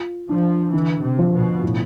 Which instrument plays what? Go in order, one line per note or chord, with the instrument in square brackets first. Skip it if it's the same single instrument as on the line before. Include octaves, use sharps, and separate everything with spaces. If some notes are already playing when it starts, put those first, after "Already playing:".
Already playing: [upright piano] F4
[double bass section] F3 [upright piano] D4
[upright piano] D3 [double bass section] E3
[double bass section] C3
[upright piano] F3
[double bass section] B2
[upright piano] A2